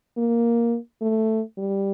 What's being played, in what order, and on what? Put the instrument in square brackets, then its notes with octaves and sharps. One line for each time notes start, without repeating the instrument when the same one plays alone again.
[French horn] A#3
A3
G3